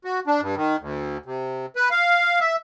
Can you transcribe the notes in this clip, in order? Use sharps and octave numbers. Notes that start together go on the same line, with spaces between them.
F#4
D4
G2
D#3
D2
C3
B4
F5
E5